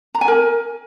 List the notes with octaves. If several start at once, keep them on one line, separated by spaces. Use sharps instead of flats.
A#5
G#5
A#4